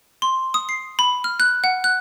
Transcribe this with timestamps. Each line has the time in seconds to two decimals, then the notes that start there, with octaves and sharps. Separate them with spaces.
0.22 C6
0.54 D#6
0.69 C7
0.99 B5
1.24 F6
1.40 F#6
1.64 F#5
1.84 F#6